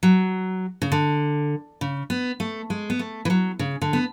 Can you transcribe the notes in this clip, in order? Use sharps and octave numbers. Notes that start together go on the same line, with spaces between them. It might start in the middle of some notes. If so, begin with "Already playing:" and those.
F#3
C#3
D3
C#3
B3
A3
G#3
B3
A3
E3
F#3
C#3
D3
B3